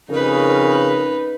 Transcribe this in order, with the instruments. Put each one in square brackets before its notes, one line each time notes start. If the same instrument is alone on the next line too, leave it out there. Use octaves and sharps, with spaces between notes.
[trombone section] F2 C#3 [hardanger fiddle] D#4 B4 [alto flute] A#4